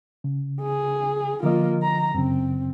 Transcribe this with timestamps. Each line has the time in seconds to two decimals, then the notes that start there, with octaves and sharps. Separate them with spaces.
0.24 C#3
0.61 G#4
1.43 D3 F3 A#3 F4 D#5
1.83 A#5
2.14 F#2 C#3 C4